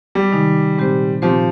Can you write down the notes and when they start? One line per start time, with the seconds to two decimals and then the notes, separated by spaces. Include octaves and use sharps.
0.15 G3
0.31 C3 D#3 G#3 D#4
0.77 A#2 G#3 C4 G4 C5
1.22 A#2 F3 G#3 C4 G4 C5